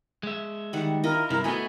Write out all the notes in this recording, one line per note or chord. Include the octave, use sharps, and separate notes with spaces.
G#3 E5
D#3 G3 F#5
E4 F4 A#4 D#5
G2 C3 E4
A3 B3 F#4 D#5 E5 G#5